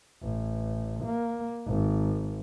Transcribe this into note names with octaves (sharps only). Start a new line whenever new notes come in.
A1
A#3
G#1